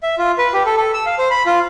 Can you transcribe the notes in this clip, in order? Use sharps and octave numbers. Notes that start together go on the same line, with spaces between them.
E5
F4
B4
G4
A4
A4
E6
F5
C5
B5
F4